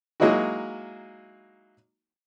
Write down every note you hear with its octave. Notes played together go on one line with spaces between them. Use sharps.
F#3 G#3 A#3 D#4 E4 F#4